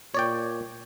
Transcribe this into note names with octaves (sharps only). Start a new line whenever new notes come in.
A#2 C#5 D5 G5